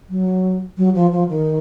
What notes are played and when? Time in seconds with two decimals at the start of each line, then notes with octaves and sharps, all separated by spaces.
0.10 F#3
0.77 F#3
0.95 F3
1.12 F3
1.29 D#3